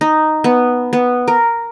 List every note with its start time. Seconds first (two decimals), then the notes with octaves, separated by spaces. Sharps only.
0.01 D#4
0.44 B3
0.93 B3
1.28 A#4